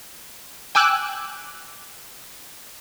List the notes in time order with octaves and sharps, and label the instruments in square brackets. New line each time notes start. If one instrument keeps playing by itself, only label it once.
[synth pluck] G5 G#5 D6 E6 F#6